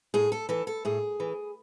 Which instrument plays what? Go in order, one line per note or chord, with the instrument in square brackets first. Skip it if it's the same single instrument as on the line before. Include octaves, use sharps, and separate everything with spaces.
[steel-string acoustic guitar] A2 G#4
A4
E3 A4
A4
A2 G#4
E3